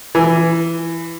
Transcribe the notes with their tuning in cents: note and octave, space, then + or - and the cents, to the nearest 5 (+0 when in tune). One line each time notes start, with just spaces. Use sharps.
E3 +15